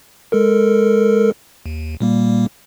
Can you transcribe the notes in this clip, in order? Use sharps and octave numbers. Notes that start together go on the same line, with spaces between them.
G#3 A4 A#4
D#2
A#2 G3 A#3